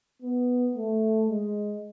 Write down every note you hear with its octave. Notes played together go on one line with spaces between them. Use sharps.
B3
A3
G#3